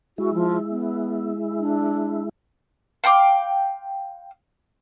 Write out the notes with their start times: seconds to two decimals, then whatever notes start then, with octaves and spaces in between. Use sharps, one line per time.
0.18 G#3 E4 F#4
0.34 F3
0.70 B3
1.60 D4
3.04 F5 G5 C6 D6